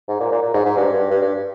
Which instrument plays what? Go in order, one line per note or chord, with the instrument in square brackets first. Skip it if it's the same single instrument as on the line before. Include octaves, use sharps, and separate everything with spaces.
[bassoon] G#2
A#2
A#2
A#2
G#2
G#2
G2
G2
G2
G2